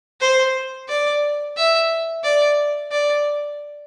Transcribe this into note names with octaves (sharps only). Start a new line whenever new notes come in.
C5
D5
E5
D5
D5